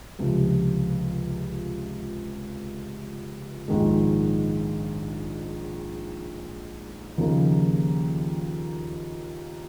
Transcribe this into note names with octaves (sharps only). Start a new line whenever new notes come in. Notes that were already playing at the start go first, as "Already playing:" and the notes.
C#2 C3 F3
A#1 G#2 D#3 G#3
D#2 C#3 F3 A#3 D#4